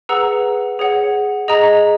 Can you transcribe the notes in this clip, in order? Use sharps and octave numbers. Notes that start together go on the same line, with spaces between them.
G#4 B4 F#5 A#5 E6
G#4 C#5 F#5
G#4 D#5 A#5